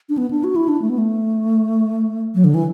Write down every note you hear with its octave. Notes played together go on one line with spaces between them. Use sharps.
D4
B3
D4
F#4
E4
D4
A3
B3
A3
F#3
D3
E3